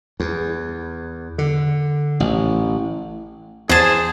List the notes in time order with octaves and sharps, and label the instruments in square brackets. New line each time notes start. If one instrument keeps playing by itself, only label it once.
[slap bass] E2
D3
A1
[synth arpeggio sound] E2 [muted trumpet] G#4 [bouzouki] C5 A5